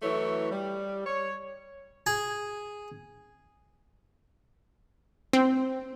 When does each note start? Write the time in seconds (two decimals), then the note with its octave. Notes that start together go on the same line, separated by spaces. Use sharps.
0.02 E3 F#3 A3 E4 C#5
0.51 G3
1.06 C#5
2.06 G#4 G#5
5.33 C4